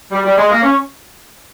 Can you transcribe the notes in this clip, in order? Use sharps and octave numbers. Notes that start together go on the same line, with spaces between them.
G3
G3
G#3
A#3
C#4